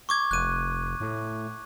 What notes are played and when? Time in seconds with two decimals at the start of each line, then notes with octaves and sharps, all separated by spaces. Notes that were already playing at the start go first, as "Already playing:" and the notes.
0.09 C#6 D6 G#6
0.31 F1 F#6 D#7
1.00 A2